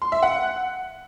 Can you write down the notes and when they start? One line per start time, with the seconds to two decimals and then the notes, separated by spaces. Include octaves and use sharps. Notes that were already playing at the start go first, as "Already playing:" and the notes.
0.02 C6
0.12 E5
0.23 F#5